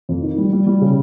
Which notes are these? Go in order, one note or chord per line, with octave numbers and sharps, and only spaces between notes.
F2
D#3
G3
G3
G3
C#3